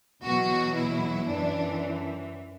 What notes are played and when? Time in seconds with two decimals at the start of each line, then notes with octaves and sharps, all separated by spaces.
0.24 E2 B2 F#3 F#4
0.75 E4
1.28 F#2 E3 D4